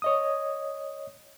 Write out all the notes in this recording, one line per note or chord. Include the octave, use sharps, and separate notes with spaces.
C#5 D#5 D#6